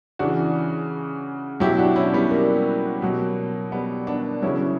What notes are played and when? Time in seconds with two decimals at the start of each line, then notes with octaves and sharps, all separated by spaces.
0.19 C#3 E3 D4 F#4
1.60 B2 F#3 E4 G4
1.78 D4 F#4
1.96 C#4 E4
2.13 G3 B3
2.31 A#3
3.02 B2 F#3
3.72 G3 B3
4.07 B3 D4
4.42 C#3 F#3 C#4 E4